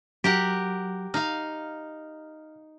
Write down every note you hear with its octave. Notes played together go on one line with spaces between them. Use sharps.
F#3 G4 A#4 F#5
D#4 F5 F6